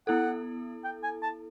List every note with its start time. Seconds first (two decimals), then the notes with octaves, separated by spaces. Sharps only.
0.07 B3 E4 A4 F#5
0.84 G5
1.03 G#5
1.22 A5